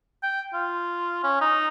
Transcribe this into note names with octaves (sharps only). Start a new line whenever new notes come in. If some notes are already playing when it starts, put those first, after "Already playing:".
G5
F4
C#4
D#4